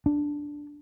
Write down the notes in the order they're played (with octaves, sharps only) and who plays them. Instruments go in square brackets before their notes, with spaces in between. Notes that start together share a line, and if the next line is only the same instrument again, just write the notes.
[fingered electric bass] D4